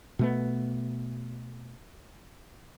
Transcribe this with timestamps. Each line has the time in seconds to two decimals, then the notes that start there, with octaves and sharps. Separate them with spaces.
0.19 B2 A3 B3